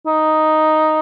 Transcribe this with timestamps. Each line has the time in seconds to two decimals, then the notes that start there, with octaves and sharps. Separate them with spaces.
0.06 D#4